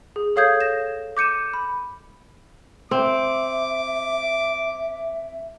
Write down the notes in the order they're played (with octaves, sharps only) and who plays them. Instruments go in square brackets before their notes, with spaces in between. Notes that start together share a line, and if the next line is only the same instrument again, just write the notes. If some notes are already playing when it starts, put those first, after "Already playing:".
[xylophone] G#4
A4 C#5 F5 D#6 G6 G#6
A#6 E7
D6 G6 C#7 D#7 E7
B5
[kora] C4 [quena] E5 [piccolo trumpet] D6